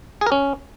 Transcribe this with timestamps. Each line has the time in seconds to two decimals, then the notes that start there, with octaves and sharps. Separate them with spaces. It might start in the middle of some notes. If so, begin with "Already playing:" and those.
0.21 G#4
0.26 A#4
0.32 C#4